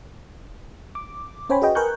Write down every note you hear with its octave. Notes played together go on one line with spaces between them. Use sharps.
D6
C#4 C5 C#5 G5 G#5 B5
F#4 G#4 B4 D#5 G5
A#4 B4 G#5 C#6 F#6 G6